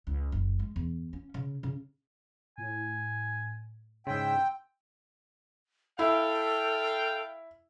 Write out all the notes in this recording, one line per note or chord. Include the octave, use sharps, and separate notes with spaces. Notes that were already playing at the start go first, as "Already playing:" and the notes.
C#2
F#1
G#3
E2
C#4
C#3
C#3
A2 G#5
G#2 C#3 E4 G5 C6 E6
E4 A4 F5 G5